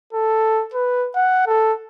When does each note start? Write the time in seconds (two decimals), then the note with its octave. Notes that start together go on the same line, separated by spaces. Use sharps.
0.13 A4
0.74 B4
1.15 F#5
1.47 A4